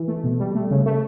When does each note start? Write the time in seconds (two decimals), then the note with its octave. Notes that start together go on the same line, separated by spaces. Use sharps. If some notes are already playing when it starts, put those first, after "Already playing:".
Already playing: E3
0.08 A3
0.24 B2
0.40 G3
0.55 A3
0.71 C#3
0.86 A3